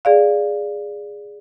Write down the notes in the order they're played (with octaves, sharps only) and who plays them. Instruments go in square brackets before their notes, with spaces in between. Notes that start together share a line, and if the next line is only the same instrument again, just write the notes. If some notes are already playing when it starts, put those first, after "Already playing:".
[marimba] G#4 D5 F5